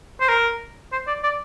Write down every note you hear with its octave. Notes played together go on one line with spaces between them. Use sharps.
C5
A#4
C5
D5
D5